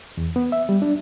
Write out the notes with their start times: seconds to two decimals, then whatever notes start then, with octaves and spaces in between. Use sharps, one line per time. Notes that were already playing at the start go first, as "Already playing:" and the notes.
0.17 E2
0.36 B3
0.52 E5
0.69 G3
0.82 D4